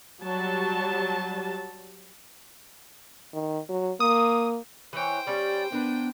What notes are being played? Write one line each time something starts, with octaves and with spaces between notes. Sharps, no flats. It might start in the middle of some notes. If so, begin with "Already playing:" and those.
F#3 G3 A5
D#3
F#3
A#3 D#6
E3 C5 C#5 G5
G3 C#4 G4 D5
B3 D4 A#4 B4